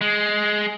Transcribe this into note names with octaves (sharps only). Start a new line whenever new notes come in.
G#3